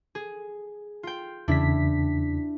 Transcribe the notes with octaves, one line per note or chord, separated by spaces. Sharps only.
G#4
F4 G5
E2 C#3 D4 E4 B6